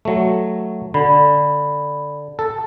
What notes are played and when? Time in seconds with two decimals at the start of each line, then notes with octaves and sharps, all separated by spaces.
0.05 F#3 A3
0.94 D3 B5
2.39 A4